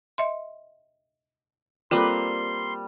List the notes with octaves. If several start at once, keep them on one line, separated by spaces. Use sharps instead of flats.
D#5 E5 C6
G3 A#3 C4 F4 A4 B4 C6